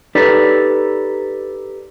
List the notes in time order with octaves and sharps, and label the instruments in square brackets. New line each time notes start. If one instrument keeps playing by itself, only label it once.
[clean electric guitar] D#4 G4 A4 B4 C#5 D5